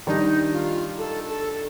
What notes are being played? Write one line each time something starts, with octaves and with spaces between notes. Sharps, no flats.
D#3 G3 D4 D#4
F4
A4
A4